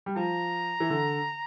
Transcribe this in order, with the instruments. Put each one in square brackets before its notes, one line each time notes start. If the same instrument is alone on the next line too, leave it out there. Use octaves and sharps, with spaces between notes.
[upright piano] G3
[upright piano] F3 [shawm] A#5
[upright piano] E3
D3